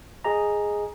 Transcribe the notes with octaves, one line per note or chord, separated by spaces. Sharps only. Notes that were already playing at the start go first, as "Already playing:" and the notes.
G#4 D#5 A#5